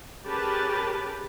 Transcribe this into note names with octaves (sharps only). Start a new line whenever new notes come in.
C#4 G4 G#4 A#4 B4 A5